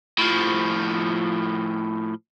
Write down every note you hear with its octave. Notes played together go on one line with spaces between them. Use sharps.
A2 F3